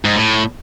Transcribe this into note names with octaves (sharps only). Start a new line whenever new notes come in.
G#2
A2